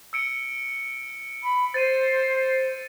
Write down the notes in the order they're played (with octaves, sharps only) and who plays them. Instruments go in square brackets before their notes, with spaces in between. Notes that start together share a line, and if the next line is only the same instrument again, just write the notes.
[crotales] E6 C#7 D7
[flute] B5
[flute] C5 [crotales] A6 D#7